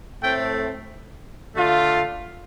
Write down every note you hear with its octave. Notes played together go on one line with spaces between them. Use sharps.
A2 A3 C4 G5
D3 A3 F4